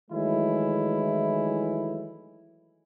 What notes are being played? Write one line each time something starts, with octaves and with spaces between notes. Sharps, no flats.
D#3 E3 F#3 G#3 A3 E4